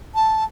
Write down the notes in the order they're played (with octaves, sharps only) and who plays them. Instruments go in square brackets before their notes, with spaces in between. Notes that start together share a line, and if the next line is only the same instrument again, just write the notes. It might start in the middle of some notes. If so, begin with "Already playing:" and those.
[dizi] A5